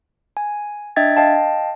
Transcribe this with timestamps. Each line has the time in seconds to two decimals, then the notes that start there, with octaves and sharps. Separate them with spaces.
0.37 G#5
0.96 D4 D#5 E5 G5 G#6 A6
1.17 D#5 F5 G5 A5